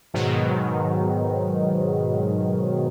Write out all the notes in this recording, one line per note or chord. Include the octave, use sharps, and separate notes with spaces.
G#2 B2 D#3 F#3